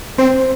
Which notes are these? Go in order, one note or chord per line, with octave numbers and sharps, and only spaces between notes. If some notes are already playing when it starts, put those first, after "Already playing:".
C4 C5